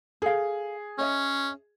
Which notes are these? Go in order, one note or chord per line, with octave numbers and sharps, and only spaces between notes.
G#4 A4 F5
C#4 C#5 D#5 E5